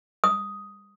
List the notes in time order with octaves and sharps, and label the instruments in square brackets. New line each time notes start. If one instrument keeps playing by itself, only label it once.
[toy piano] D#6